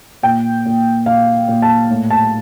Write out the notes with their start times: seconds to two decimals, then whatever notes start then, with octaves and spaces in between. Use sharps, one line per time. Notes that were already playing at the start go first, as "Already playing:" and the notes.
0.23 A#2 G5
0.65 A#2
1.06 A#2 F5
1.48 A#2
1.62 A5
1.90 A2
2.10 A5